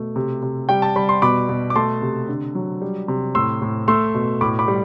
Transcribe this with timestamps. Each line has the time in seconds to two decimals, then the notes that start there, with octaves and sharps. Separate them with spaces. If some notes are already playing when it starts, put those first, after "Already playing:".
Already playing: B2 A3
0.16 C3
0.42 C3
0.69 G3 G5
0.82 A5
0.96 G3 B5
1.09 C6
1.22 B2 B5 D6
1.49 B2
1.70 D6
1.76 A3 A5 C6
2.02 C3
2.29 D3
2.55 F#3
2.82 G3
3.08 C3
3.35 A2 C6 E6
3.62 A2
3.88 A3 C6 E6
4.15 B2
4.41 A2 B5 D6
4.59 B5 D6
4.68 G3